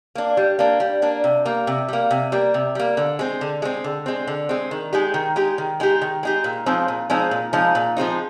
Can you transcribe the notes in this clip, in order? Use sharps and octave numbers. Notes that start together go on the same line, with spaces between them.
A#3 D4
G3
A#3 D4
G3
A#3 D4
C3
G3 A#3
C3
G3 A#3
C3
G3 A#3
C3
G3 A#3
D3
G#3 C4
D3
G#3 C4
D3
G#3 C4
D3
G#3 C4
D#3
G#3 D#4 G4
D#3
G#3 D#4 G4
D#3
G#3 D#4 G4
D#3
G#3 D#4 G4
A#2
F3 G#3 C4 D#4
A#2
F3 G#3 C4 D#4
A#2
F3 G#3 C4 D#4
A#2
F3 G#3 C4 D#4